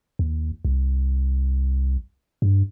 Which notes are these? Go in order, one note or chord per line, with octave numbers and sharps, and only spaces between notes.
D#2
C2
G2